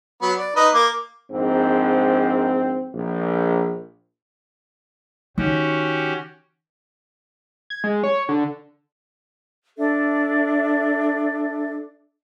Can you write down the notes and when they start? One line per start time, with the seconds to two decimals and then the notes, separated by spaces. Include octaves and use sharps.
0.22 F#3 B3
0.38 D5
0.56 D#4 B4 D#5
0.74 A#3 D6
1.30 A#1 G#2 C4
2.93 A#1
5.38 D#3 C#4 F#4 G4
7.70 G#6
7.84 G#3
8.03 C#5
8.29 D3
9.78 D4 A4 E5